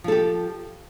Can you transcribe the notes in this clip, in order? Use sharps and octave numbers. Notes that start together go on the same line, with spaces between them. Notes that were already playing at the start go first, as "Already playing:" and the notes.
F3 G4 A4